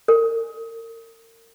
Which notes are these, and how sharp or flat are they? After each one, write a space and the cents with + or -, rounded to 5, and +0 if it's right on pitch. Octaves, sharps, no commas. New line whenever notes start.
A#4 -35